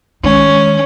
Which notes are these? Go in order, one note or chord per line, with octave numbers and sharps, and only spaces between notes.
D#3 G#3 C#4